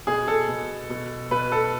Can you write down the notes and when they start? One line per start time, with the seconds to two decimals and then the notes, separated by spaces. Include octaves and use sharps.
0.07 B2 G#4
0.28 A4
0.48 B2
0.90 B2
1.31 B2 B4
1.52 A4